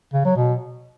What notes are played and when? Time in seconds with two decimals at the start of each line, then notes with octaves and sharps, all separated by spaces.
0.14 C#3
0.25 F#3
0.36 B2